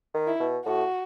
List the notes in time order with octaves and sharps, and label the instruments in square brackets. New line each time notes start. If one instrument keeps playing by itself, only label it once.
[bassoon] D#3
[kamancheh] E4
[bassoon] B2
[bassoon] A2 [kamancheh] F#4